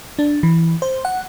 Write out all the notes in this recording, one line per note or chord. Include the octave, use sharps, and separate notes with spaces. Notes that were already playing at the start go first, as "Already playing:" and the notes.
D4
E3
C5
F#5